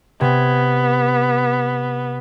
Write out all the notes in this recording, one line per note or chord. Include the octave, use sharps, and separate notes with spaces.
C3 B3 G#6